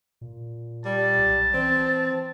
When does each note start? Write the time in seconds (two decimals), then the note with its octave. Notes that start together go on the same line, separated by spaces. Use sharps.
0.21 A#2
0.85 G3 A5
1.18 B1
1.54 E3 C4